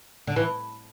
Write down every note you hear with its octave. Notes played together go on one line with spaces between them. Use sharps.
D3
E3